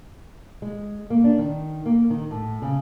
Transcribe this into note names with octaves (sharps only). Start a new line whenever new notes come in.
G#3
A#3
D4
D#3
A#3
D#3
A2
C#3